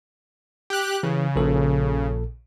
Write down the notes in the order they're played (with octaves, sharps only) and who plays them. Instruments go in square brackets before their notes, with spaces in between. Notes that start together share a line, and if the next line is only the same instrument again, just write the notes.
[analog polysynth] G4 F#6
[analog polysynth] C#3 [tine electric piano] E3
[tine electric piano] A#1 A#2 A4